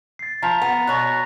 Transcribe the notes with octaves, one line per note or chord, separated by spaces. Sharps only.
A6 C7
F3 A#5 B6 F7
B3
B2 C#5 F#6 A#6